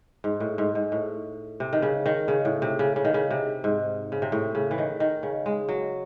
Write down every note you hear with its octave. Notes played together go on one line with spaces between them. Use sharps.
G#2
A2
G#2
G#2
A2
C3
D#3
C#3
D#3
C#3
A2
C3
C#3
C#3
D#3
C#3
C3
G#2
C#3
C3
A2
C#3
E3
D#3
D#3
C#3
G#3
F#3